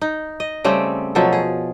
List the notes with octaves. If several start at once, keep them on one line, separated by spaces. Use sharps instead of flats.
D#4
D#5
C#3 G3 A3 C4
B2 F3 F#3 A4
G#4